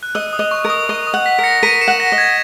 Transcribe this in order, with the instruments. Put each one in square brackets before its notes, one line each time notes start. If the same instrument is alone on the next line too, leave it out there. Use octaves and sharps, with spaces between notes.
[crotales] F#6
[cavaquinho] D#5 [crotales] E6
[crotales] D#6
[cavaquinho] D#5
[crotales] C#6
[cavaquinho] A#4
[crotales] D#6
[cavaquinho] D#5 [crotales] C#6
[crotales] D#6
[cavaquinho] F#5
[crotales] B6
[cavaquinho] A#4
[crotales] A#6 C#7
[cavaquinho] A#4 [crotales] B6 D#7
[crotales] C#7 E7
[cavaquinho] F#5
[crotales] A#6
[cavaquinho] D#5 [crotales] A#6
[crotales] G#6